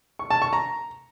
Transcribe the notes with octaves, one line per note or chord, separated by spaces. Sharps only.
C#6
A5
C#6
A#5